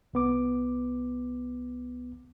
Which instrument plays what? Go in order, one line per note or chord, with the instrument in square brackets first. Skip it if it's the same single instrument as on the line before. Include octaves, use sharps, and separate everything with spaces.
[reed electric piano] C2 B3 D6